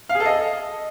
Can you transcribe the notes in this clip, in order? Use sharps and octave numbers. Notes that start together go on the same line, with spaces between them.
F5
G#4
A4
D#5